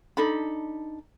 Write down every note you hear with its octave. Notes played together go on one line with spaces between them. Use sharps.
D4 D#4 A4 B5